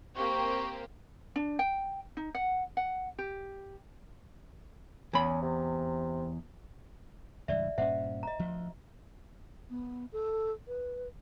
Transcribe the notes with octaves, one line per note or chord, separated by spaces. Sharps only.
A#3 C4 G4 C#6
D4
G5
D#4
F#5
F#5
G4
E2 C#4 B5
C3
C#2 G2 E3 D5 E5
G2 A#2 C#4 C5 E5 F#5
D#5 A#5
D2 F3
B3
A4
B4